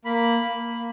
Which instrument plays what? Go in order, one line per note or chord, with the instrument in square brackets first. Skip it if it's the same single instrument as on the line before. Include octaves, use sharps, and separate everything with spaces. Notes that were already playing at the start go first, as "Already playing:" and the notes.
[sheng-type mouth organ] A#3 B5
A#3
A#3